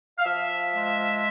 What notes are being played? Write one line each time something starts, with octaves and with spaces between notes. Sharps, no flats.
F5
F3 E5
G#3